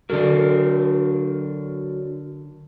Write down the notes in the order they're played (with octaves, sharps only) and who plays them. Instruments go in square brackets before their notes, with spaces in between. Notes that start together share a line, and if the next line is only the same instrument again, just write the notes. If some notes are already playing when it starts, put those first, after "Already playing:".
[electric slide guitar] D3 A4 A#4 [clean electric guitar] F#3 D4